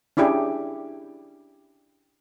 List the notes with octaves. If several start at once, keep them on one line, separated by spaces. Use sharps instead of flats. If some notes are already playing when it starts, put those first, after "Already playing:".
C#4 D4 E4 G4 G#4